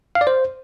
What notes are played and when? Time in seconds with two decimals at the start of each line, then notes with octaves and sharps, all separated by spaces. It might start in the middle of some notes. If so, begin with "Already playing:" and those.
0.15 F5
0.21 D5
0.27 C5